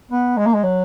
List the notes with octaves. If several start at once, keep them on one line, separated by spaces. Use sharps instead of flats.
B3
G#3
A#3
G#3
F#3